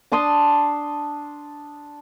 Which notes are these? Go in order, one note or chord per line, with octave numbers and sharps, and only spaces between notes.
D4 A5 C6 D#6